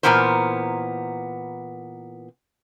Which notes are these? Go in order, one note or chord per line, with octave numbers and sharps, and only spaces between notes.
A#2 D#3 E3 B3 A#4 C5